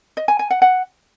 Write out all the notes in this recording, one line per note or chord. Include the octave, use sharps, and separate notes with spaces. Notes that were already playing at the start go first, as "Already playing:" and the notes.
D#5
G#5
G#5
F#5
F#5